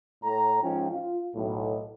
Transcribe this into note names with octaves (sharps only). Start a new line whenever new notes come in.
A2 A3 C#5 A#5
G#2 F3 C#4 F4 G5
F4
B1 A2